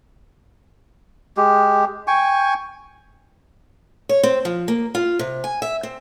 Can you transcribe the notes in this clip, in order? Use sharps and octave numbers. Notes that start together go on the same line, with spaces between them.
G#3 G4
G5 G#5 C#6
C#5
C4
F3
A#3
F4
C3
G#5
E5
C4